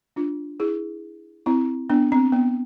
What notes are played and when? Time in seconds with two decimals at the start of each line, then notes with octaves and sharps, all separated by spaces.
0.16 D4 F4
0.60 E4 G#4
1.46 C4 E4
1.90 B3 D4
2.12 C4
2.32 B3